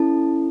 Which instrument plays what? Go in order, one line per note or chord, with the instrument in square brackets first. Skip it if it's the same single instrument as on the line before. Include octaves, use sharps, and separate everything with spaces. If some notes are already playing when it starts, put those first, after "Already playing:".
Already playing: [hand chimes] C#4 E4 A4 A5